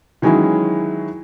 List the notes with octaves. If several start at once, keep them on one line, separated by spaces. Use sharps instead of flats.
D#3 E3 F#3 G#3 C#4 E4